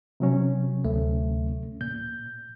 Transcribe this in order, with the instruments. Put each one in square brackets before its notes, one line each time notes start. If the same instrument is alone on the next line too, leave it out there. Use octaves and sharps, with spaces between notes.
[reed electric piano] C3 F#3 C#4
[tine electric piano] D2 A3
[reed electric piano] A#2 [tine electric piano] G6